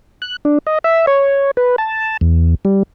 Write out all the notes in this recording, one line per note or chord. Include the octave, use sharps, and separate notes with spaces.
F#6
D4
D#5
E5
C#5
B4
A5
E2
G3